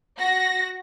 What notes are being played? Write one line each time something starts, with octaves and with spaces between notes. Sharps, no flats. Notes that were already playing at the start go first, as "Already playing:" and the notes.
F#4 A#6